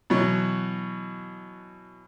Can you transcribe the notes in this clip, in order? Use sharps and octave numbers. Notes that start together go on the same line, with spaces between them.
B2 E3 F#3